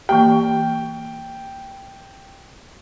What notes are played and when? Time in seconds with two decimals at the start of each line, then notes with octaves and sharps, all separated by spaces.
0.09 E3 A#3 G4 G5